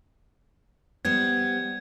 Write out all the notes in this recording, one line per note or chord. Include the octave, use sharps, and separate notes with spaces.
G3 B3 C5 G#6